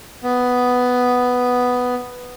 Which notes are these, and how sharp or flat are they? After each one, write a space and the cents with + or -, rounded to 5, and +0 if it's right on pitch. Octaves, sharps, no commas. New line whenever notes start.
B3 +5